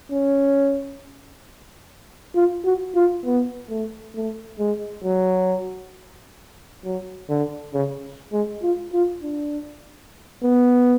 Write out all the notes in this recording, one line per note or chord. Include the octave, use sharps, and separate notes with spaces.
C#4
F4
F#4
F4
B3
A3
A3
G#3
F#3
F#3
D3
C#3
G#3
F4
F4
D4
B3